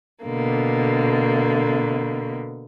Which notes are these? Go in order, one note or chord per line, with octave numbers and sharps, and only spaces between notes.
B2 D3 A#3